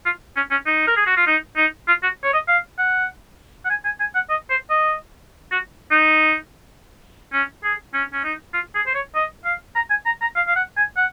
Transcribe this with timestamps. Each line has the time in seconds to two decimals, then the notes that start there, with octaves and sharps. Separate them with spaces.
0.06 F4
0.37 C#4
0.51 C#4
0.67 D#4
0.87 A#4
0.97 G#4
1.07 F#4
1.17 F4
1.27 D#4
1.57 D#4
1.88 F4
2.03 F#4
2.24 C#5
2.34 D#5
2.48 F5
2.78 F#5
3.65 F#5
3.70 G#5
3.85 G#5
4.00 G#5
4.15 F#5
4.30 D#5
4.50 C5
4.70 D#5
5.52 F#4
5.91 D#4
7.33 C#4
7.64 G#4
7.94 C#4
8.13 C#4
8.24 D#4
8.54 F4
8.75 G#4
8.87 C5
8.95 C#5
9.15 D#5
9.45 F5
9.76 A#5
9.90 G#5
10.06 A#5
10.21 A#5
10.36 F5
10.47 F5
10.56 F#5
10.77 G#5
10.97 F#5